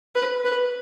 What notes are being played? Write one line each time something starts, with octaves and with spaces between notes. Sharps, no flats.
B4
B4